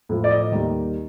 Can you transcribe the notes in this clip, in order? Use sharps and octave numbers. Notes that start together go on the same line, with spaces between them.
A2 F3
D5
D#5
D#2 D#3 G3